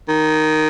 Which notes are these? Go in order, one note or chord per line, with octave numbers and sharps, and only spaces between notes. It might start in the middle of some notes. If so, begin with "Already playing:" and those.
D#3